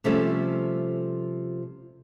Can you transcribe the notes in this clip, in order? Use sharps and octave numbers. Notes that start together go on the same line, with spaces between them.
C3 F3 G3 A3 C#4 A4